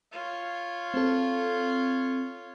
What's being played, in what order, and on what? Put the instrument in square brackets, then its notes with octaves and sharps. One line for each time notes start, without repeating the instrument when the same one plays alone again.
[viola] F4 C#5
[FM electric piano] C4 A4